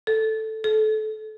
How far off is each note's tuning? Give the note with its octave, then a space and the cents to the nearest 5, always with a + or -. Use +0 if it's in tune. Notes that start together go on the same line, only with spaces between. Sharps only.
A4 +0
A4 -25